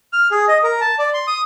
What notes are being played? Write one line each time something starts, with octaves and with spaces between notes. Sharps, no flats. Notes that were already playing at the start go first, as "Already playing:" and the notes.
F6
G#4
D#5
A#4
A5
D5
C6
D#6